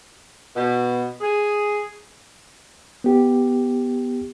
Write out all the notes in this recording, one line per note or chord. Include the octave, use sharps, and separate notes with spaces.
B2
G#4
B3 G4